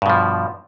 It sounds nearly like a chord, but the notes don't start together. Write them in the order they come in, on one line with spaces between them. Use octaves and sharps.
G2 B2 F3